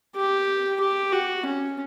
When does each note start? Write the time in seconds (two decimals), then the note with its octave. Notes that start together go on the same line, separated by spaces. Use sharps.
0.16 G4
0.80 G4
1.13 F#4
1.45 C#4